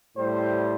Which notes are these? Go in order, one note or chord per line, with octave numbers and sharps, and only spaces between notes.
A2 G3 C5